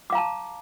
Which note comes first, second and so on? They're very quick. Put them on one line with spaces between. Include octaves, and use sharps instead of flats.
D6 F5 A#5 A5